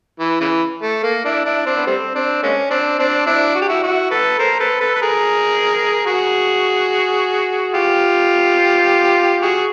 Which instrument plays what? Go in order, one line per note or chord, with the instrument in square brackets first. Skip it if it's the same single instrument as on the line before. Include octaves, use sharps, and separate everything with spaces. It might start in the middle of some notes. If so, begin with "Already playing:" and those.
[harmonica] E3
C#3 E3
A3
A#3
D4 E4
D4 E4
C4 D4
B3
G3 A3 C4
C4 D4
G#3 A#3 C#4
C4 D4
C4 D4
D4 E4
F#4
G4
E4 F#4
E4 F#4
A4 B4
A#4 C5
A4 B4
A4 B4
B4
G#4 A#4
F#4 G#4
F4 G4
F#4 G#4